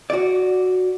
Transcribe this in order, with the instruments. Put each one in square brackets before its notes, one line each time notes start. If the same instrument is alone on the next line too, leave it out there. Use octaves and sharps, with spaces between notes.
[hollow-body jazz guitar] F#4 D5